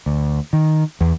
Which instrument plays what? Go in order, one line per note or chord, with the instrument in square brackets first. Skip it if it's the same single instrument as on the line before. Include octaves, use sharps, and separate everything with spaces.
[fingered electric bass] D2
D#3
E2